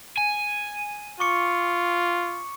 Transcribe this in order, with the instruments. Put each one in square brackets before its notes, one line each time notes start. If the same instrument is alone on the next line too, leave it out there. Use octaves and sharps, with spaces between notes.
[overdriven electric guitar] G#5
[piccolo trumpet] F4 [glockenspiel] C#6 D6 C#7